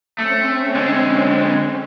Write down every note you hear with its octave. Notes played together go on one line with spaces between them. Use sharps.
A3 C4 C#4
D3 G#3